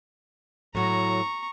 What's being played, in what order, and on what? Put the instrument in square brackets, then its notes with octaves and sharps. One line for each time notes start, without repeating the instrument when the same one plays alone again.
[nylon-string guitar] A2 F#3 [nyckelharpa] A#5 C#6